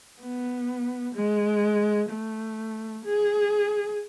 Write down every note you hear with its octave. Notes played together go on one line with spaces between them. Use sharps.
B3
G#3
A3
G#4